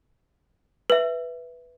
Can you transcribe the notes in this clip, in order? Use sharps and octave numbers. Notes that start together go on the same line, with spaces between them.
B4 E5